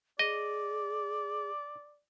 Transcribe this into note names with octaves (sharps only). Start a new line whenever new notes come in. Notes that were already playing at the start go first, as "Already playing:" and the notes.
G#4 D5 D#5